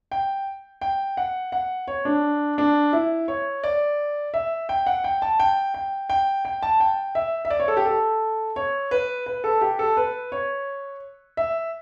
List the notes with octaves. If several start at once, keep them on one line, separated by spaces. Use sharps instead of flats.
G5
G5
F#5
F#5
C#5
D4
D4
E4
C#5
D5
E5
G5
F#5
G5
A5
G5
G5
G5
G5
A5
G5
E5
E5
D5
C#5
A4
G4
A4
C#5
B4
B4
A4
G4
A4
B4
C#5
E5